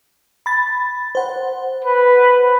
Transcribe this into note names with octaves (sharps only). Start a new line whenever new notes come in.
B5 A6
C5 F#5
B4